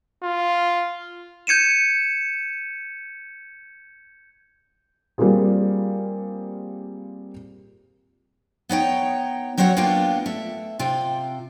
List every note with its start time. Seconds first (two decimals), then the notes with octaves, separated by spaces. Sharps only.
0.23 F4
1.47 G6 G#6 C#7 D#7 E7
5.18 G3 A#3 C4 F4 G#4
8.69 B3 D#4 C#5 G5
9.58 F#3 C4 F#4 C#5 F#5
9.77 A#3 B3 D4 F4 G5
10.26 A3 E5
10.79 C3 F4 G5